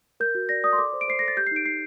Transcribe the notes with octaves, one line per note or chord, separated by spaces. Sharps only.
A#4 G6
F#4
D5 A#6
D5 D#6
C6
A4 D6
C5
D7
C5 C7
A4 A#6
A6
G4 G6
C7
D#4 D7
D#4 C7